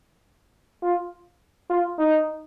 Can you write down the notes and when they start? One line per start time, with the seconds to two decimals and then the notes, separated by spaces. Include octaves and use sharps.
0.83 F4
1.70 F4
1.99 D#4